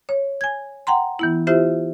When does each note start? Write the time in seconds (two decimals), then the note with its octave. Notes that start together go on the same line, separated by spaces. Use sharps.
0.09 C#5
0.41 G#5 G#6
0.87 F#5 G5 A#5 C6
1.19 E3 B3 E4
1.47 E4 F4 G4 C5 E5